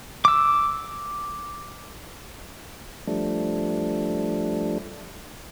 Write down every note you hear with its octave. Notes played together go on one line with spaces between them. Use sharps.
D6 E6
F3 G3 A3 D4